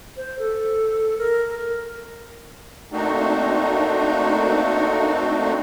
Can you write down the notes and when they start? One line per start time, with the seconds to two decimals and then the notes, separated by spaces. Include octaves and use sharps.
0.17 C5
0.39 A4
1.18 A#4
2.92 A3 A#3 C4 D4 D#4 F#4